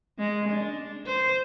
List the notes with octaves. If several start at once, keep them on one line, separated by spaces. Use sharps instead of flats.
G#3
D4
C5